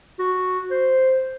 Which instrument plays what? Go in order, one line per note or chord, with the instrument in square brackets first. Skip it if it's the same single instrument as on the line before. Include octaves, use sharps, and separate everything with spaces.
[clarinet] F#4
C5